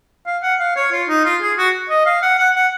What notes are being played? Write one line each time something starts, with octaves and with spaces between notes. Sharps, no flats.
F5
F#5
F5
C#5
F4
D#4
F4
G#4
F#4
D#5
F5
F#5
F#5
F#5